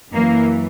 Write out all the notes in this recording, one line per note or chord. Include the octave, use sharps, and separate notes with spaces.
F#2 E3 A#3